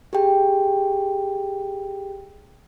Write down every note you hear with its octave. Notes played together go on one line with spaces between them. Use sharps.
G4 G#4 G5